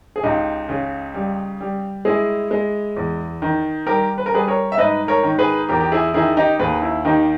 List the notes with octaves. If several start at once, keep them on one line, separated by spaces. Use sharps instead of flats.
G#4
C#2 D#4 G4
C#3
G3
G3
G#3 E4 G#4
G#3
E2
D#3
G3 G4 A#4
B4
A#4
G3 G#4 B4
A#4 C#5
E5
G#2 B4 D#5
A#4 C#5
D#3
G#4 B4
E2 G4 A#4
G4
E4 G#4
D#3 E4 G#4
D#4 G4
D#2 G#4 B4
E4
D#3 D#4 G4